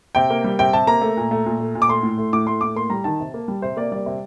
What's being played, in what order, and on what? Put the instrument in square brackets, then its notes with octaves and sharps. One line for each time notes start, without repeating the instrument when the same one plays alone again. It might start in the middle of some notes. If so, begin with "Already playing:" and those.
[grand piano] C3 G5
A#3
G3
C3 G5
C3 A5
A#3 A#5
A3
A#2
A3
A#2
A3
A#2
D6
A3 C6
A2
A3
A2 D6
A3 C6
A2 D6
A#3 C6
G3 A#5
D#3 A5
C3
A#3
G3
C3 C5
A#3 D5
G3 D5
C3